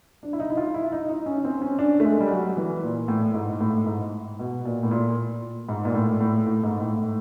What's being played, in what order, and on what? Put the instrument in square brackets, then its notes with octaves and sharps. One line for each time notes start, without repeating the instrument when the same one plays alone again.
[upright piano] D4
E4
D#4
E4
F4
E4
D#4
D#4
C#4
C4
C#4
D4
A3
G#3
G3
F#3
E3
A#2
A2
G#2
A2
G#2
B2
A#2
A2
A#2
G#2
A#2
A2
A2
A2
G#2
A2